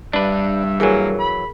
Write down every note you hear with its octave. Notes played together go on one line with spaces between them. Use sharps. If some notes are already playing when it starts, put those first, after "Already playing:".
G2 G3 D4 B4 E5
E3 F#3 A#3 G#4 A#4 G#5
B5